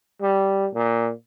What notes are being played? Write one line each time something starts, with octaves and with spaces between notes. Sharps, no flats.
G3
A#2